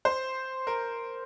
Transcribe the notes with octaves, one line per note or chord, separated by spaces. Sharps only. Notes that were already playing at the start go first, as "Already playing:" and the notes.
C5
A#4